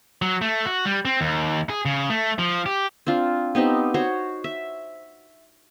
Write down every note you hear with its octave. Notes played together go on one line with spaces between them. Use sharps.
F#3
A3
F#4
G3
C4
D#2
G#4
C#3
A3
F3
G4
C4 D4 F4
B3 C4 D#4 G4
F#4 C5 C#5
E5